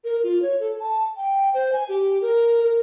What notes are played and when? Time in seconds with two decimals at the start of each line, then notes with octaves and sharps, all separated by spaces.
0.04 A#4
0.23 F4
0.42 C#5
0.60 A4
0.80 A5
1.17 G5
1.54 C5
1.73 G#5
1.89 G4
2.22 A#4
2.64 A#4